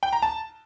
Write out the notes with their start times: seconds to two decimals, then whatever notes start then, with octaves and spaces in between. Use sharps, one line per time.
0.03 G5
0.13 A#5
0.22 A5